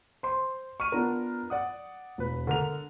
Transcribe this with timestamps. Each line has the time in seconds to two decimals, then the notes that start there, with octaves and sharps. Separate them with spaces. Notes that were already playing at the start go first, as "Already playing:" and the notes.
0.23 C5 C6
0.80 C#6 F6 D#7
0.92 B3 D4 F4 A#4
1.50 D5 F#5 D#6
2.18 E1 B4
2.47 D3 A#4 F7